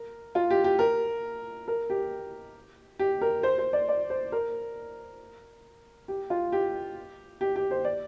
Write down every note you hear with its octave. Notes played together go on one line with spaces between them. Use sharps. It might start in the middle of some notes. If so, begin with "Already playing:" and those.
Already playing: A#4
F4
G4
G4
A#4
A#4
G4
G4
A#4
C5
C5
D5
D5
C5
A#4
G4
F4
G4
G4
G4
C5
D5